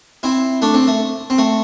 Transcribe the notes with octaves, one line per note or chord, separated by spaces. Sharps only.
C4 E4
A3 D4
C4
A3
C4
A3